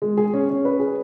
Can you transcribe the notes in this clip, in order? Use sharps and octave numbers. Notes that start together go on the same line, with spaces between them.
G#3
G#4
C#4
C#4
B4
G#4